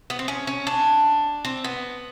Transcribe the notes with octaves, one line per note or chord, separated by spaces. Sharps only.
B3
C4
C#4
C#4
D4
C4
B3